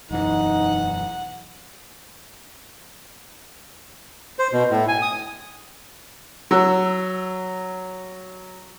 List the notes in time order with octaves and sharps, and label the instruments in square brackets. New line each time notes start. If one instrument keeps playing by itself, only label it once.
[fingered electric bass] E1 F#2 E3 [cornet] D#4 [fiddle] F#5
[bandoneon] C5
B2
A2
G#5
D#6
[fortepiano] F#3 E6